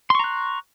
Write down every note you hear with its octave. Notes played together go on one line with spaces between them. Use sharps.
A#5 C6 C#6 F#6